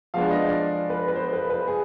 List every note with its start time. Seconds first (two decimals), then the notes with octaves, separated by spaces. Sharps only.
0.14 F3 G#3 B3 D4 F5
0.30 D#5
0.48 D5
0.90 B4
1.08 B4
1.16 C5
1.33 B4
1.50 B4
1.67 G#4